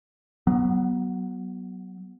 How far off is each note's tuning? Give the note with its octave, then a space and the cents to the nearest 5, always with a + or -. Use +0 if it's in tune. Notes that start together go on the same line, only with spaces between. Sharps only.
F#3 +20 B3 -10